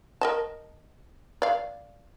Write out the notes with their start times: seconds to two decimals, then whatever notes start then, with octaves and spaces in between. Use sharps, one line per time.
0.21 A#4 D#5 A5
1.42 D5 F5